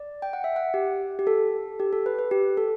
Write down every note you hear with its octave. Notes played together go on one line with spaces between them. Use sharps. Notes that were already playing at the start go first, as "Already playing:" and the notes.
Already playing: D5
G5
F#5
E5
F#5
G4
G4
A4
G4
A4
B4
B4
G4
A4